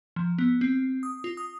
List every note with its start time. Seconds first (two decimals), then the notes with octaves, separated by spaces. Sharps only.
0.16 F3
0.38 B3
0.61 C4
1.03 D#6
1.24 F4
1.37 D#6